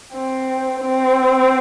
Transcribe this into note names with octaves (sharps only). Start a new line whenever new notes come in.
C4
C4